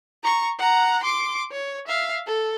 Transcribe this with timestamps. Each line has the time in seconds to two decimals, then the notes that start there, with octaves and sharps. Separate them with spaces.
0.23 A#5 C#6
0.59 F#5 A#5
1.03 C6 D6
1.52 C#5
1.87 E5 F5
2.27 A4